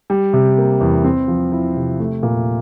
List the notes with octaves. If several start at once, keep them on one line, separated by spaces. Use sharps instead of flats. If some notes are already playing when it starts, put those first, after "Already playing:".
G3
C3
A#3
E2
C4
F3
E4
C3
A3
A#2